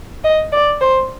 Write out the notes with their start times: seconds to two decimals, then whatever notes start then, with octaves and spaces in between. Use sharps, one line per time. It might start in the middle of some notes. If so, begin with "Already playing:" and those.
0.24 D#5
0.53 D5
0.81 C5